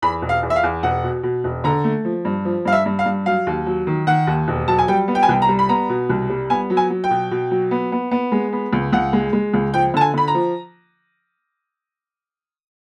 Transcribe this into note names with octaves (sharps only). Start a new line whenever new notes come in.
E2 B5
E1
F5
E2
E5
F5
E2
E1 F#5
B2
B2
E1
D3 A#5
A3
F3
G2
F3
G2 F5
E5
G2
F5
G2
F#3 F5
D#2
F#3
D#3
D#3 F#5
D#2
E1
F#3 A5
G#5
G3 G5
B3
G5
G#5
C2 G5
A#5
G3
B5
B3 A#5
B2
C2
G3
B3 G#5
F#3
G#5
F#3
G5
B2
B2
F#3
B3
B3
B3
G#3
B3
C#2
C#2 F#5
G#3
G#3
C#2
F3 G5
D3 A5
G#5
D3 B5
A#5
F3